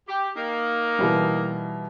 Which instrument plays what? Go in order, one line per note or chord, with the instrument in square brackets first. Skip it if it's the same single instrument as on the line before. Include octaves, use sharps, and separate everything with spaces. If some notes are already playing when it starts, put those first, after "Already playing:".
[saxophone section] G4
A#3 D#4
[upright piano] B2 E3 G3